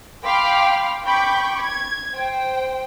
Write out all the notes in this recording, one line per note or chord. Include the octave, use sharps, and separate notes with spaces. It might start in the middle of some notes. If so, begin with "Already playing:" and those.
F5 G5 B5 C6 D6
G5 B5 C#6 D6 G6
G#6
C5 G5